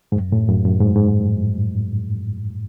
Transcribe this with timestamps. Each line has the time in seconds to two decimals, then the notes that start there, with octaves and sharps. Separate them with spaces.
0.12 G#2
0.16 F#2
0.32 A2
0.49 F#2
0.64 F#2
0.80 G#2
0.96 G#2